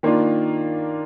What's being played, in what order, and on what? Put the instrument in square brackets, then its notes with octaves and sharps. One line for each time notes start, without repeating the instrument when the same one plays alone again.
[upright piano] D#3 A#3 D4 F4